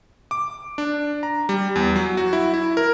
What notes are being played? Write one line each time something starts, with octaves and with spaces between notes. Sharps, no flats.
D6
D4
A#5
G3
E2
F#3
F#4
E4
E4
A#4